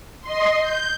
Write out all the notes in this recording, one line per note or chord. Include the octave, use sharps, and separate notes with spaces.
D#5 C6
G6